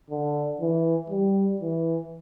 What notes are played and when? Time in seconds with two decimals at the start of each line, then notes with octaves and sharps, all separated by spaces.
0.10 D3
0.60 E3
1.10 G3
1.61 E3